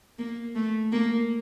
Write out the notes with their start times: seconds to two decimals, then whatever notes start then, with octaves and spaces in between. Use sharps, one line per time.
0.19 A#3
0.55 A3
0.92 A#3